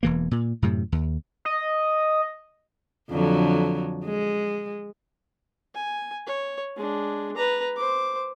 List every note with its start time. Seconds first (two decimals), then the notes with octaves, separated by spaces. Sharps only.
0.03 E1 E3 A#3
0.31 A#2
0.62 F#2 A2 C3
0.92 D#2
1.45 D#5
3.10 F2 D3 F#3
4.05 G#3
5.75 G#5
6.27 C#5
6.76 G#3 D4
7.37 B4 A#5
7.76 C5 D6